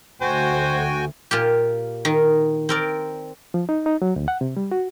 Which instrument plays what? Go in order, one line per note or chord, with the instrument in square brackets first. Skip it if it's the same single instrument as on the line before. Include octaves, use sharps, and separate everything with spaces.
[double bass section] D2 [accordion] F#4 G5 G#5 [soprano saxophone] C5
[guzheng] A#2 F4 G4
D#3
C4 A#4 D5
[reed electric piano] F3
D#4
D#4
F#3
D2
F#5
C3
G3
F#4